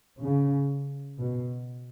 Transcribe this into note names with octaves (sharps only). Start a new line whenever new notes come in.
C#3
B2